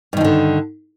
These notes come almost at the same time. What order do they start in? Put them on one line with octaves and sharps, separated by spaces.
G2 D#3 F3 D3